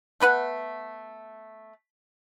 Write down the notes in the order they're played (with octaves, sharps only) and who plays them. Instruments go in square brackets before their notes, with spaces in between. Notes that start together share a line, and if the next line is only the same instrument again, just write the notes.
[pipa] A3 B3 B4 F#5